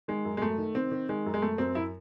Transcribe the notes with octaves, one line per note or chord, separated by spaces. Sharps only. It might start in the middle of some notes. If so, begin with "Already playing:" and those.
D#3 G#3
F#2
G#3
F#2 A3
D#3
D#3 C4
D#3
D#3 G#3
F#2
G#3
F#2 A3
F#2 C4
F#2 E4